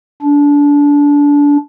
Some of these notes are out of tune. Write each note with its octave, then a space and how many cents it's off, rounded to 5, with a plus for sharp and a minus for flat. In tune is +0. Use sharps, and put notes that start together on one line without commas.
D4 -25